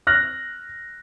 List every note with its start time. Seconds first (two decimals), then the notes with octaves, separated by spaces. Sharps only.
0.07 F6 F#6 A#6